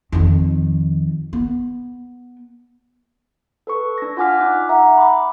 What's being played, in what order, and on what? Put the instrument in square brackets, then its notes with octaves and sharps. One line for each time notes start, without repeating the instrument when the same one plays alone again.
[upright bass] F2 D#3
B3
[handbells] A4 B4 C#6
D4 A#6
F4 F#5 G#5 D6 F6 B6
D#4 D6 F#6
E5 F#5 A#5
B5 D6